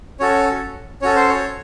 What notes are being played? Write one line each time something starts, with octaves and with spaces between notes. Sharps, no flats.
C#4 F#4 A4 C#5
C#4 F#4 A4 C#5
C5
C#5